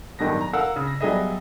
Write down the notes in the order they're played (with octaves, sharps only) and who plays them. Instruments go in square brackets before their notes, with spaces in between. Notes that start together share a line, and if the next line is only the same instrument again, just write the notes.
[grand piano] D1 G2 D#3 G3 B3 A#6
A#5
A#4 F5 F#5 E6
C#3
A#6
F#3 G3 B3 G#4 D#5 E5